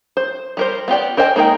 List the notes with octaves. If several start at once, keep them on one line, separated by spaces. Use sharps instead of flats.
C5
G3 A#4 C5
B3 F4 G4 D5
A#4 C5 D#5 G5 G#5
G#3 A#3 D#4 A#4 G5